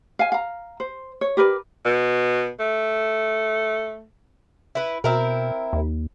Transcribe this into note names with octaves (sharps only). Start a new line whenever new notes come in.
F5 G#5
F5 A#5
C5
C#5
G4 A#4 B4 D5
B2
A3
E4 B4
B2 C4 E4 A#4
D#2